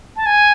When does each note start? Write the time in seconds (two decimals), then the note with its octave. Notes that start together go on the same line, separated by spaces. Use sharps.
0.16 A5
0.26 G#5